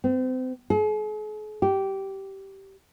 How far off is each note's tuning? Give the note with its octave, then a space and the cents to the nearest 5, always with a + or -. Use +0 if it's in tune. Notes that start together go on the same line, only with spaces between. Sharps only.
C4 -35
G#4 +45
G4 -15